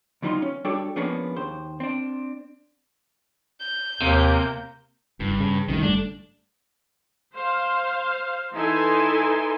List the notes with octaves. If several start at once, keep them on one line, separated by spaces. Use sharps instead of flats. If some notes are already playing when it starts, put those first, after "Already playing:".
D2 F#3 G3 D#4 F4 C6
C#4
G3 D4 F#4 G4 A4 C#5
F3 G#3 A#3 B3 C#4 D4
D#2 C5
C4 D4
G6
D#2 C3 A#3
F#1 G2
C#3
C2 F#2 A2 D#3
G1 G3 A3 D4
C5 F5
E3 D#4 E4 A4 G#5 C6